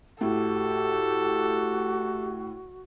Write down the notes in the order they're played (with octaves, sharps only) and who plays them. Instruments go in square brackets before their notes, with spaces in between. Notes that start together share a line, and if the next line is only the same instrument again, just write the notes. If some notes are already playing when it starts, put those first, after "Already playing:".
[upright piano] A2 [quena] F#4 [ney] G4 [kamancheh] A4